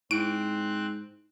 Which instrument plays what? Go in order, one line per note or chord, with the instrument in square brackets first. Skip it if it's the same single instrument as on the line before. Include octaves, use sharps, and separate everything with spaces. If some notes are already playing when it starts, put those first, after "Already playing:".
[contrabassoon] G#2 [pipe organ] C4 F#6 [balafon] E4 [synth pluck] D7